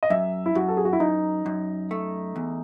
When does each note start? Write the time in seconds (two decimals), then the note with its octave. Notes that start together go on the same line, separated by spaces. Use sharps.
0.03 D#5
0.10 F#2 E5
0.46 E4
0.55 F#2 F#4
0.68 A4
0.77 G#4
0.85 F#4
0.93 E4
1.00 F#2 D#4
1.46 F#2
1.91 A3
2.36 E2